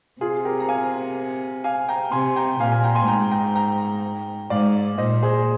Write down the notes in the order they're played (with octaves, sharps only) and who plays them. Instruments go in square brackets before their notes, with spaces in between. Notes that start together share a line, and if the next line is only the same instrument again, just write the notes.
[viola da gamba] C3 [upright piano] F4 G#4
[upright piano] G4 A#4
A#5
F5 G#5
F5 G#5
G5 A#5
[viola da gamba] C3 [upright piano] G#5 C6
[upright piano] G5 A#5
[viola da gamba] A#2 [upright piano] F5 G#5
[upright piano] F5 G#5
G5 A#5
G#5 C6
[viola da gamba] G#2 [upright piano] G5 A#5
[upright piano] G5 A#5
G5 A#5
[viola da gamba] G#2 [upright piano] D5 F5
[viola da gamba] A#2 [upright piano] C5 D#5
[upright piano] G#4 C5